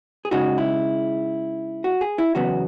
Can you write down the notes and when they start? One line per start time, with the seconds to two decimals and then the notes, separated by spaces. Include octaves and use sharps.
0.25 G#4
0.31 C#3 G#3 D#4 F#4
0.58 E4
1.84 F#4
2.01 G#4
2.18 E4
2.35 E2 C#3 F#3 B3 F#4